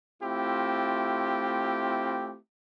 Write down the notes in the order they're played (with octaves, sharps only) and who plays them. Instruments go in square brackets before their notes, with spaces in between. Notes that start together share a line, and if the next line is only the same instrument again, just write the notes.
[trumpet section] A3 C4 E4 F4 G4